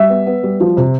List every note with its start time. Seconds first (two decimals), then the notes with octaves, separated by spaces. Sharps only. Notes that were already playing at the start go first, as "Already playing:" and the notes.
Already playing: G3 E5
0.09 B3
0.26 B3
0.43 G3
0.60 F3
0.77 C3